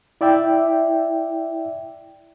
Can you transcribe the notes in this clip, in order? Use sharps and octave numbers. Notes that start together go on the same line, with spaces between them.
E4 D5 E5 G5